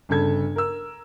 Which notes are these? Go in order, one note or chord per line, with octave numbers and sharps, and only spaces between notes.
G1 C#3 A4 G#6
A#4 E6